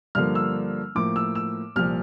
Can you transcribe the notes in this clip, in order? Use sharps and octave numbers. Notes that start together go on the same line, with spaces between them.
G2 D3 F3 A#3 F6
E6
A2 F3 A#3 D6
E6
E6
C2 A#2 F3 F6